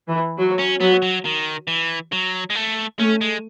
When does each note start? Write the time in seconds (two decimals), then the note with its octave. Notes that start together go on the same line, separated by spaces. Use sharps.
0.09 E3
0.38 F#3
0.59 C#4
0.80 F#3 B3
1.02 F#3
1.25 D#3
1.67 E3
2.12 F#3
2.50 G#3
2.55 A3
2.98 A3 C#4
3.21 G#3